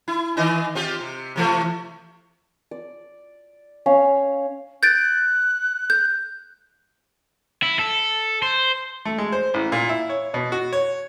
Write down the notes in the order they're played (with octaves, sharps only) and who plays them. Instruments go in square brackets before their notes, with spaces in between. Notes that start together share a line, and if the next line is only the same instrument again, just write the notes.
[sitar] E4
D#3 E3 D#5
C4 F4 G4
C3
C3 E3 A3
[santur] D5
C#4 F5
[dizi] F#6 [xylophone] G6 A6 D7
[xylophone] G6
[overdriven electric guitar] E4
A4
C5
[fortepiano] A3
G#3
C5
A1
A#2
E4
C#5
B2
F#4
C#5